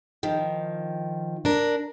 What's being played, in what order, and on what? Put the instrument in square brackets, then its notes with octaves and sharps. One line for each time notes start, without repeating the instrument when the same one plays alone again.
[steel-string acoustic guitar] D#3 F3
D4 A#4